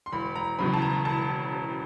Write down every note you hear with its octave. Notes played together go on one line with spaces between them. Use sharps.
C6
E1 B5
A#5
E2 C#3 F#3 B5
A5
A#5
E1 A5